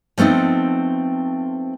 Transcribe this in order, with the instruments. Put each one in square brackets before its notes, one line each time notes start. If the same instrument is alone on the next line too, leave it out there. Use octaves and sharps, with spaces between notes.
[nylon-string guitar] F3 A3 B3 C4 D#4